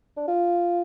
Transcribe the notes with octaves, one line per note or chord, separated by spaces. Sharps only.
D4
F4